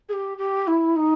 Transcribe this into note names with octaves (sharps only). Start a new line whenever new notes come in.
G#4
G4
G4
E4
D#4